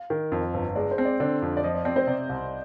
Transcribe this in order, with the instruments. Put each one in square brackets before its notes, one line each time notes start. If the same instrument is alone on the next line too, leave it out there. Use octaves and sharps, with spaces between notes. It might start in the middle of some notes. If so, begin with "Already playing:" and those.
Already playing: [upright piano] F5
[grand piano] D#3
F2
G1
[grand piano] G#3 [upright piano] D5
[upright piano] C5
[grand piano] C4
[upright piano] D5
[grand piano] D3 [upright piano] D5
[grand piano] F2
[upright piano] D5
[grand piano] F3 [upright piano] D#5
[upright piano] D5
[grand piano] C4 [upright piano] D5
[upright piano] C5
[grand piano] C3 [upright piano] D5
[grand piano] C2